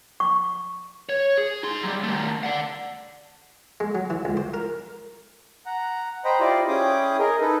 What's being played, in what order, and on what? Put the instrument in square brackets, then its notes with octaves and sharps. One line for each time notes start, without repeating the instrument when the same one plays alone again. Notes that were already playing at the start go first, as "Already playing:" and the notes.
[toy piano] C#6
[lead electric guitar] C#5
G#4
D#4 C6
F#3 G3
D#3 A3
D5 F#5
[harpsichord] G#3
F#3
E3
C#2
C5
A#4
[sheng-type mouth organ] F#5 A#5
C5 D#5 G5 A#5 B5
E4 F4 G4 C5 D5 D#5
C#4 E4 G#4 G5 D6 D#6
G#4 A#4 D#5
D#4 A4 B4